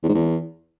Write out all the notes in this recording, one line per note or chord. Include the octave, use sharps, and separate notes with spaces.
E2
G#2
E2